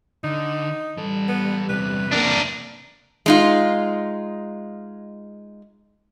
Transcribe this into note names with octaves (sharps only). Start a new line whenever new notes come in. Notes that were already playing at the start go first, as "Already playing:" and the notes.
D3 D#4
E3 G3 A4
B3
E2 C3 B4
A#3 D4 A#4
G#3 D#4 F4